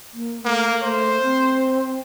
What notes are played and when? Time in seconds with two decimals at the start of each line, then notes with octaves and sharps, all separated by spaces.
0.13 A#3
0.45 A3 A#3
0.82 A3 C5
1.22 C4